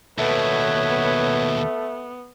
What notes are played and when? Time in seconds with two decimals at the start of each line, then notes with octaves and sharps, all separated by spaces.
0.18 D#2 B2 A3 B3 B4 C#5